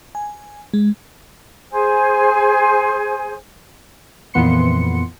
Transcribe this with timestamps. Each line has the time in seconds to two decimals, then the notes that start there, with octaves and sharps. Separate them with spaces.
0.15 G#5
0.74 G#3
1.71 G#4 C5 G#5
4.34 F2 A#2 E3 B3 C6 C#7